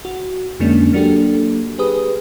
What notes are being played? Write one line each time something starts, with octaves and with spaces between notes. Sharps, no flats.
F#4
F2 D3 G#3 A#3 C#4 D4
F#3 A#3 D4 F#4 G4 A4
G4 G#4 B4 D#6